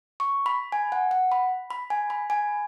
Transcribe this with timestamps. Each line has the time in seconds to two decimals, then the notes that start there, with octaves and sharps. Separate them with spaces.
0.20 C#6
0.46 B5
0.72 G#5
0.92 F#5
1.11 F#5
1.32 B5
1.70 B5
1.90 G#5
2.10 B5
2.30 G#5